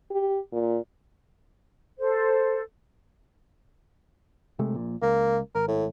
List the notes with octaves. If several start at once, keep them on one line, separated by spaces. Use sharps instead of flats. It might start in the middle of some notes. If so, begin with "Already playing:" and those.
G4
A#2
A4 C5
C3 G#3 A3
A#1 A#2
C#2 A#3
G#1 A#4
A2